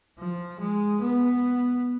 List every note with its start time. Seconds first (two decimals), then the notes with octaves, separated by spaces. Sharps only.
0.18 F3
0.60 G#3
1.02 B3